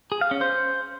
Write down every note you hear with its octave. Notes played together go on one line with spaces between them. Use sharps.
G#4
F5
C#4
C5